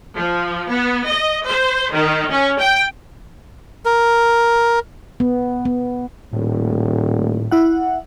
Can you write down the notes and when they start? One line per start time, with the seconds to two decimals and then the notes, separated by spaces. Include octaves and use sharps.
0.16 F3
0.69 B3
1.09 D#5
1.48 C5
1.93 D#3
2.31 C#4
2.60 G5
3.85 A#4
5.20 B3
5.65 B3
6.33 D#1 A2
7.51 E4 F#5